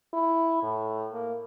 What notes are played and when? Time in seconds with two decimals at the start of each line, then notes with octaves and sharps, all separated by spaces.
0.13 E4
0.62 A2
1.12 A#3